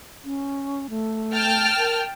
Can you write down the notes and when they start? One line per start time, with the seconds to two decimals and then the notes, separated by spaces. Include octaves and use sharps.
0.24 C#4
0.90 A3
1.32 G5 A5 F6
1.78 A#4